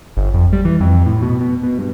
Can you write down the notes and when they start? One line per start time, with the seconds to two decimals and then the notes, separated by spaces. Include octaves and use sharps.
0.17 G1
0.34 F2
0.53 G3
0.65 E3
0.80 F2
1.06 A2
1.22 B2
1.40 B2
1.63 B2
1.79 G2